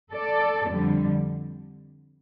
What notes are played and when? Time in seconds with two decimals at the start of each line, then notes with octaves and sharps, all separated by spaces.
0.14 A4 D5
0.69 F2 D3 G3